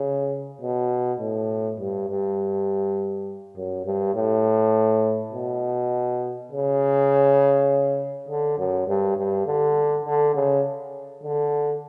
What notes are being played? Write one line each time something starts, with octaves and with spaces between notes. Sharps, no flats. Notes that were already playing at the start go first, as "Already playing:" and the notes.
Already playing: C#3
B2
A2
G2
G2
F#2
G2
A2
B2
C#3
D3
F#2
G2
G2
D3
D3
C#3
D3